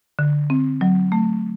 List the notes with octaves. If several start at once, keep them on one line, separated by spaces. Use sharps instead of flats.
D3
C4
F#3
A3